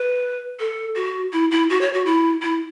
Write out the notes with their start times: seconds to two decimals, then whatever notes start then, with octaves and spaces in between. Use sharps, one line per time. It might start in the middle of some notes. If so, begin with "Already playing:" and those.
Already playing: B4
0.60 A4
0.96 F#4
1.33 E4
1.51 E4
1.70 F#4
1.81 C#5
1.93 F#4
2.06 E4
2.42 E4